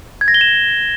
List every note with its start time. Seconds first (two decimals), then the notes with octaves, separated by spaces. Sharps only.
0.21 G#6
0.28 A#6
0.34 G7
0.41 E7